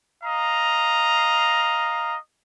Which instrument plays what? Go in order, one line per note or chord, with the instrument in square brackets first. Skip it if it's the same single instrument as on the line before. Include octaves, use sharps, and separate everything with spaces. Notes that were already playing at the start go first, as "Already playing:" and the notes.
[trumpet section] D#5 F5 A#5